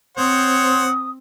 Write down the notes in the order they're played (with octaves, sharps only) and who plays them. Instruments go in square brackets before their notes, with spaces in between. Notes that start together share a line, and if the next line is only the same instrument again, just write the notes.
[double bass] C4 [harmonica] C5 C#5 F#5 [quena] D#6